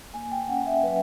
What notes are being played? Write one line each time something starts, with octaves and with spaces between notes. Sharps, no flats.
A#3 G#5
G5
C#4 F#5
E5
F#3 B4